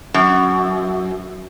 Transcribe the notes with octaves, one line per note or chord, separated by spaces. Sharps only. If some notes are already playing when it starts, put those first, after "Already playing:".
F#2